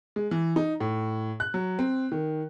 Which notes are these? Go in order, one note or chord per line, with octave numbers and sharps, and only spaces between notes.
G#3
E3
D#4
A2
F#6
F#3
C4
D#3